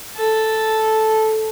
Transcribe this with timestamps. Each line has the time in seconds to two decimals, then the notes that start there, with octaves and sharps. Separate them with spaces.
0.17 A4